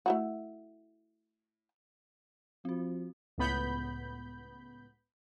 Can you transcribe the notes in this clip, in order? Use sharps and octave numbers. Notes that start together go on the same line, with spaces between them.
A3 E4 F#4
F3 C4 F#4
C#2 A2 B3 B5 G6